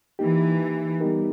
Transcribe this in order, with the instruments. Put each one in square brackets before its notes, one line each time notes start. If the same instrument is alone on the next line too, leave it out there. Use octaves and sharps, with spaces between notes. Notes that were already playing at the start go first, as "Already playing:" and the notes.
[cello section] E3 [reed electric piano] A#3 D#4 G4
[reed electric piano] G3 B3 D#4 G4 A#4